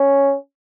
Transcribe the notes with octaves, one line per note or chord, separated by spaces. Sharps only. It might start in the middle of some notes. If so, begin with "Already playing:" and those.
Already playing: C#4